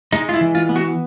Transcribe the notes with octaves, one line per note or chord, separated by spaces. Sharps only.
G#3 D#4
F4
E4
E3
F4
B3
F#4